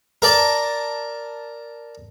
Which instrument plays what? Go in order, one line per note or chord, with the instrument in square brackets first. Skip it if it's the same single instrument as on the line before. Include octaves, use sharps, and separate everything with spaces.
[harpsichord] A#4 D5 A5